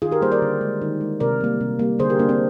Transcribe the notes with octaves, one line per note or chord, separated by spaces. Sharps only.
D#3 F4 G#4
G4 A#4
G3 A#3 G#4 C5
A#4 D5
D3
G#3
D#3
G#3
C3 A#4 D5
G3 A#3
C3
G3 A#3
D3 G#4 C5
G4 A#4
G3 A#3 D4
C4